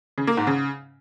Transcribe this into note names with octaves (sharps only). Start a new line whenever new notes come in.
C#3
A#3
G#2
C#3